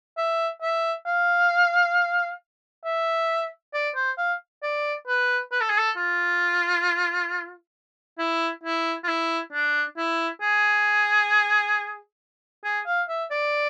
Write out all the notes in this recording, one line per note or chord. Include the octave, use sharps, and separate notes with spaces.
E5
E5
F5
E5
D5
C5
F5
D5
B4
B4
A4
G#4
A4
F4
E4
E4
F4
E4
D4
E4
G#4
G#4
F5
E5
D5